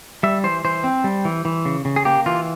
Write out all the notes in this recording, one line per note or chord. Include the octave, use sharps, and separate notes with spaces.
G3 E5
E3 C5
E3 C5
C4
G3
E3
E3
C#3
C#3
G#4
A#3 G4
E3 F4